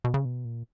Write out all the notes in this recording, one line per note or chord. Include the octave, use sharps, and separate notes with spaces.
B2
C#3
B2
A#2